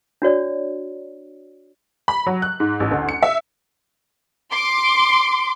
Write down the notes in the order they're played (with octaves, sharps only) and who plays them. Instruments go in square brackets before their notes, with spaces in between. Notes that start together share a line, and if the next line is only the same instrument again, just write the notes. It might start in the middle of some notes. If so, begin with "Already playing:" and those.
[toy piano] D4 F#4 C#5 D5
[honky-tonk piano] B5
F#3
F#6
G#2
A1
D2
C#7
E5
[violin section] C6 D6